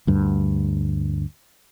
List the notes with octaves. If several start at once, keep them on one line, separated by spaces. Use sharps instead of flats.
D2 G2